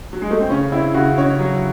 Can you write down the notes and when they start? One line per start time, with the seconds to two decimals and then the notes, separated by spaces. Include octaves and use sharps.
0.13 F#3
0.22 G#3
0.31 A3
0.41 C4
0.50 C#3 C#4
0.72 C4 E4
0.94 C#3 F#4
1.17 C#3 C#5
1.39 F#3